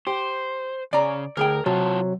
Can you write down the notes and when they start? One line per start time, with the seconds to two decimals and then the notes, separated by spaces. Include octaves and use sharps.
0.07 G4 C5
0.93 C#3 D5 A#5
1.37 D2 G#4 A#4 G5
1.66 C3 F#3 F4 F#4 A5